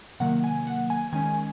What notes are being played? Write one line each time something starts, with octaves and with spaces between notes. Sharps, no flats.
C3 D#3 F#3 A#3 F#5
G#5
F#5
G#5
D#3 G#3 C#4 G#5